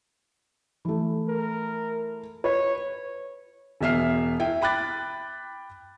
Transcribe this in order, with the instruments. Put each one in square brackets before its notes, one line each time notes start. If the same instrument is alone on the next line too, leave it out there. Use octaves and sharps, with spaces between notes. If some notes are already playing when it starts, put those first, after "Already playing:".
[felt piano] E3 A3
[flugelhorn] A#4
[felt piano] B4 [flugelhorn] C#5
[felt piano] E1 B2 E5 F6 C7
E4 G5
G5 B5 D6 F#6 A6